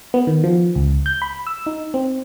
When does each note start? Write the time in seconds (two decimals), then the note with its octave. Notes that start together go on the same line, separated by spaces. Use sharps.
0.14 B3
0.27 D#3
0.44 F3
0.75 C#2
1.06 G6
1.22 B5
1.47 E6
1.66 D#4
1.94 C4